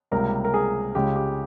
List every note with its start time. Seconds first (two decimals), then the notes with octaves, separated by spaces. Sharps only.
0.11 C#2 C3 G3 A#3 A#4
0.45 A#4
0.54 G#4
0.95 C#2 C#3 G#3 G4
1.16 G4